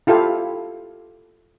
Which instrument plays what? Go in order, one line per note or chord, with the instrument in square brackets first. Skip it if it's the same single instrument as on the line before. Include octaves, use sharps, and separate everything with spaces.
[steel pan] E4 F4 G4 A4 F5